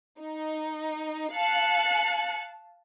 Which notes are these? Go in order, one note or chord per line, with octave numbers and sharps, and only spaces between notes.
D#4
F5 A5 F#6 C#7